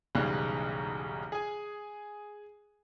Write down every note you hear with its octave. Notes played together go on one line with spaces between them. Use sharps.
B1 E2 G#2 C#3 G3 F#6
G#4 G#5